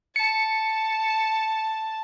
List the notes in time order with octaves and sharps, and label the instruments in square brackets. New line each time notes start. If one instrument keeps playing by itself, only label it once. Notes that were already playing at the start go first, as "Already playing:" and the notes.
[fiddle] A5 [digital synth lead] C#7